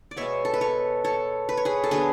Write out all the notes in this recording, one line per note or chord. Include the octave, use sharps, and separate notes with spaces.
D5
B2 G#3 B3 C#5 E5
A4
B4
A4 C#5
A4 C#5
B4
C#5
G#4 B4
A4
D3 F#3 B3 G#4 B4